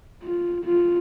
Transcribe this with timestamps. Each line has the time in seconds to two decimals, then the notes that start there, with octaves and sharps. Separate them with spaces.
0.23 F4
0.65 F4